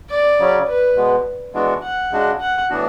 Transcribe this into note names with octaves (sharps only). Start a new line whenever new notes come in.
D5
C#3 F#3 C#4
B4
B2 G#3 B3
E3 G#3 B3 D4 F#4
F#5
C#3 G#3 D4 F#4
F#5
A2 E3 B3 D4 F#4